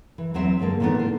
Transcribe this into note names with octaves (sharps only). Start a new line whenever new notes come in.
E3
E2 F#3 C4 C5 E5
G2 D3 G#3 A#3
A#2 D#3 E3 A3 B3
D3 C5